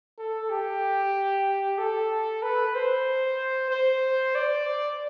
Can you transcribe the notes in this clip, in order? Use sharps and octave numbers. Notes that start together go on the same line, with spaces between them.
A4
G4
A4
B4
C5
C5
D5